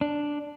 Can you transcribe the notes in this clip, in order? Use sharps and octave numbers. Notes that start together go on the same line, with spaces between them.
D4